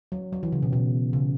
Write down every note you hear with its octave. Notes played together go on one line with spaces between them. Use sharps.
F#3
F#3
E3
C#3
B2
B2
C#3